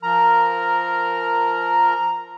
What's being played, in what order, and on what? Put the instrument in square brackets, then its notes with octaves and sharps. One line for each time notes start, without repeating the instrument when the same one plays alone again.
[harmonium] F3 A#4 [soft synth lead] A#5